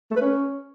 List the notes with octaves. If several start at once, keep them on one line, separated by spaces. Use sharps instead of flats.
A3
B4
C#4